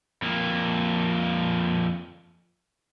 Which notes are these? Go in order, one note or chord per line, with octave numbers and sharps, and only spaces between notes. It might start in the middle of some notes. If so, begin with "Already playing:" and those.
F2 A#3